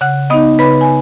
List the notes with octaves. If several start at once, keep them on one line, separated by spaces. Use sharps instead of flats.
C#3 F#5 F#6
B3 D#4 D#5 D#6
C#3 B4 B5
G#5